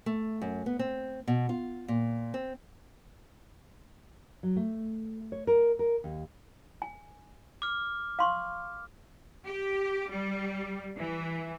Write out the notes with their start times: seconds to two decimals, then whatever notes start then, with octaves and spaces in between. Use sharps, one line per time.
0.06 A3
0.42 F#2
0.66 B3
0.79 C4
1.28 B2
1.49 F4
1.88 A#2
2.34 C4
4.43 F#3
4.57 A3
5.32 C#5
5.47 A#4
5.79 A#4
6.04 D#2
6.82 G#5
7.62 D6 F6
8.19 F5 C6 C#6
9.46 G4
10.11 G3
10.97 E3